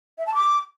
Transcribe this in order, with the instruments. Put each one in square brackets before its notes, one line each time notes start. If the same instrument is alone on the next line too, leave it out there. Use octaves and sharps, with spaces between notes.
[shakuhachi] E5
A5
D6